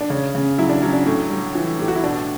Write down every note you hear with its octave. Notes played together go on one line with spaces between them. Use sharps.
D4
C#3 C#4
C#3
F#3 E4
D4
F#3 C#4
D4
A2
G3
E3
A2 G4
F#4
E4
B2 D4